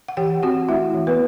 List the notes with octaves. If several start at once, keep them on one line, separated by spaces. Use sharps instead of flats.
F#5
E3 G4 G5
C4 F#4 F#5
A3 E4 E5
E3
B3 B4